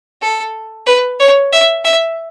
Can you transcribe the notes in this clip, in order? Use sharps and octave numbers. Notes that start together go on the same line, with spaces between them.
A4
B4
C#5
E5
E5